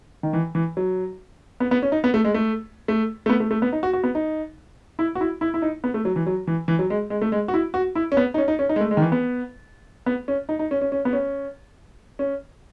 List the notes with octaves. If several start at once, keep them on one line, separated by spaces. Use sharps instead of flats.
D#3
E3
E3
F#3
B3
B3
C#4
D#4
B3
A3
G#3
A3
A3
A3
B3
A3
A3
B3
D#4
F#4
F#4
B3
D#4
E4
F#4
E4
E4
E4
D#4
B3
A3
F#3
E3
F#3
E3
E3
F#3
G#3
G#3
A3
G#3
F#4
E4
F#4
E4
C#4
B3
D#4
C#4
D#4
C#4
D#4
G#3
A3
G#3
D#3
E3
B3
B3
C#4
D#4
D#4
C#4
C#4
C#4
B3
C#4
C#4